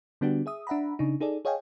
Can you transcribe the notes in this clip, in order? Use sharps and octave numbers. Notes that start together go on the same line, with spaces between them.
D3 G3 B3 D4 F#4 G4
G#4 E5 D#6
D4 E5 F#5 A#5 B5
C#3 D4 D#4
D#4 G#4 A4 D5
G#4 C#5 D#5 F5 G5 G#5